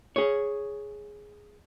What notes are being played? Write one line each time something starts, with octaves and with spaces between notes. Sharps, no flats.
G#4 C#5